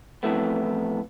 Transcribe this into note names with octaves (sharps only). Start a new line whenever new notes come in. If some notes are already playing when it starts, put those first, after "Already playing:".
F2 A2 E3 A3 B3